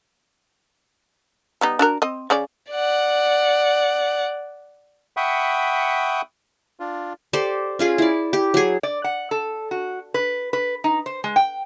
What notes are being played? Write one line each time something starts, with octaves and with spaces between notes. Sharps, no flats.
G3 B3 D#4
D4 F#4 A#4
C4 D#5
C#3 C#5 D5
D5 F#5
E5 F#5 G5 B5 C#6 D#6
D4 F4
G4 A4 C5 D5
C#4 F4 G#4
E4 D5
G4
F#3 G#4
D5
F#5
A4
F#4
B4
B4
D#4
C5
G#3
G5